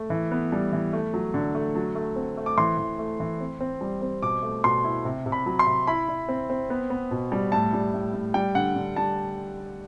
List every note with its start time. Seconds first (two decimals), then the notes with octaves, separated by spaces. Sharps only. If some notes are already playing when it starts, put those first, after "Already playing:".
Already playing: A3
0.10 E3
0.31 B3
0.52 G3
0.73 E3
0.93 A3
1.14 F#3
1.34 D3
1.55 A3
1.75 F#3
1.95 A3
2.16 C4
2.37 A3
2.46 D6
2.58 E3 C6
2.78 E3
2.99 A3
3.20 E3
3.40 C4
3.61 C4
3.81 G3
4.02 C4
4.22 B2 D6
4.43 A3
4.64 B2 C6
4.84 E4
5.05 C3
5.26 C3
5.32 B5
5.46 F#3
5.59 C6
5.67 C3
5.87 E4 B5
6.08 E4
6.29 C4
6.50 C4
6.70 B3
6.90 B3
7.11 B2
7.32 G3
7.52 A2 A5
7.73 G3
7.94 A2
8.14 A2
8.34 G3 G5
8.55 D3 F#5
8.76 D3
8.96 G3 A5